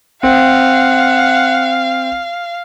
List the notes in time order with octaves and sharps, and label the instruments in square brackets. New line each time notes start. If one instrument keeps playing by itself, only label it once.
[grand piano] C4 [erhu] F5 [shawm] F#5